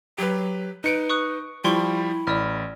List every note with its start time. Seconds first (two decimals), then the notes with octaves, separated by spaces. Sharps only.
0.18 F#3 G4 B4
0.84 D#4 B4 C#7 D7
1.09 C#6 D#6 F#6
1.64 F3 G3 E4 G5 C6 C#6
2.27 A1 D5 B5 F6